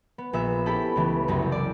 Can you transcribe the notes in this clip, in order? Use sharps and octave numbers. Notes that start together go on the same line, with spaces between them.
B3
A#1 B3 E5 E6
C#4 E4 G4 A4 A5 B5
C#2 E3 A3
F#1 C2 F#2
D5